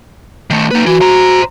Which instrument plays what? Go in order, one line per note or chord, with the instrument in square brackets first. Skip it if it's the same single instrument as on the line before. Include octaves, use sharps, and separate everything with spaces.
[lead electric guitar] D#3 A3
[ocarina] A#3 [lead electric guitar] D#4 B4
[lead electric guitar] E3 [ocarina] F#4
[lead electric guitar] C5 A#5